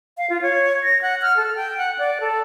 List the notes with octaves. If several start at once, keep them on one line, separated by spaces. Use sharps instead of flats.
F5
F4
C#5
A#6
F#5
F6
A4
G5
F#5
D5
A4